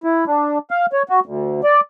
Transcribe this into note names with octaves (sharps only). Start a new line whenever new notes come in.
E4
D4
F5
C#5
F#4
D2
D5